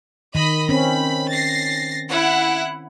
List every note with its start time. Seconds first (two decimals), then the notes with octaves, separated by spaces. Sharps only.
0.35 D#3 D#5 B5
0.69 C4 C#4 B5
1.28 A6 A#6 C7
2.08 E4 F#5